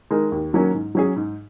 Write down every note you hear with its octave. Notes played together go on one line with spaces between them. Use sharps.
D#3 G#3 D#4 A#4
D#2
D#3 F#3 A#3 C#4
G#2
F#3 C#4 G#4
G#2